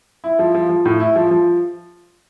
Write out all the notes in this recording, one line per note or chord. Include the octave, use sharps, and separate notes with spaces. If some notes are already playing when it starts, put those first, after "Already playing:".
E4
F3
F3
F3
A2
E4
F3
F3